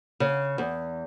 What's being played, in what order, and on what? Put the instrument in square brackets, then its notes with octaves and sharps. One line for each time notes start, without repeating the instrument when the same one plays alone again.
[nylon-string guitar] C#3
E2